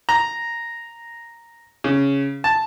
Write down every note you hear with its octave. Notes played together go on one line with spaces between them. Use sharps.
A#5
C#3
A5